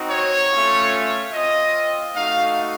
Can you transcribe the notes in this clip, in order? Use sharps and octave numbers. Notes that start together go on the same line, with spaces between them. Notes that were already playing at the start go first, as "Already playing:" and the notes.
Already playing: C4 D#4 F#4
C#5
A3 C#4 F4
C4 F4 D#5
A3 D#4 F#4 F5